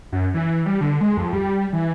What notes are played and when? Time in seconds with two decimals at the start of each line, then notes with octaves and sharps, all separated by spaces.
0.12 F#2
0.34 E3
0.66 G3
0.81 D3
1.01 G#3
1.17 F2
1.33 G3
1.73 E3